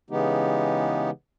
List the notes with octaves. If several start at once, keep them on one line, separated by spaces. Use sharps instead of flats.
C#3 E3 G#3 B3 D#4 G4